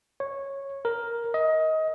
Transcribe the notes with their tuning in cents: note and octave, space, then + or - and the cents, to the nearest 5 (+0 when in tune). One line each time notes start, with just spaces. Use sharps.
C#5 -10
A#4 +5
D#5 +25